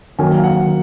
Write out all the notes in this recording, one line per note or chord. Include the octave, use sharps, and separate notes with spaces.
D#3 F#3 A#3 G#5
F5
F#5
D#3